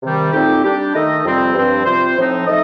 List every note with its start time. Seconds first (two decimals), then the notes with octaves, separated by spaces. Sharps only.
0.02 C3 D#3 G3
0.32 A#2 A3 C4 D#4 G4
0.64 G3 D4 G4
0.94 D#3 A3 D#4 A4 D#5
1.24 F2 C3 G3 C4
1.55 G2 F3 C4
1.85 C3 G3 C4 F4 C5
2.16 A2 F3 C4 D#4
2.46 A3 D#4 A4 D#5